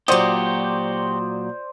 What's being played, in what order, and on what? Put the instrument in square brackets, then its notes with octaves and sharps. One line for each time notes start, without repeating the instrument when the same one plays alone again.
[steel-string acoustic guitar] A#2 F#3 [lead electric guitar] F#4 G4 [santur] C5 D5 D#6